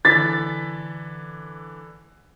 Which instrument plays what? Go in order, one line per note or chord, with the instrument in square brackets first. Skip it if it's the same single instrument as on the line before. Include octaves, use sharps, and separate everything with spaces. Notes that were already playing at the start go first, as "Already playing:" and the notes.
[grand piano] D3 E3 B6 [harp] A6